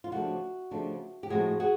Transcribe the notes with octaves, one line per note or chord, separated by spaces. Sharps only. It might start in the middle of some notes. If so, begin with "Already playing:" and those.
F4
C#3 F3 A3 D4 F#4
C#3 F3 A3 D4
G4
A2 F3 G#3 C4 F4 F#4 G#4
F#4 G#4